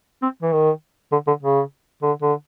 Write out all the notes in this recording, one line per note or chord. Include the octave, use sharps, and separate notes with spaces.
C4
E3
D#3
D3
D3
C#3
D3
D3